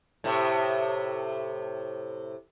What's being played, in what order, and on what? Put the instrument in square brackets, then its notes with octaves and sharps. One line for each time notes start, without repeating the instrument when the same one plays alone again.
[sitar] A2 C3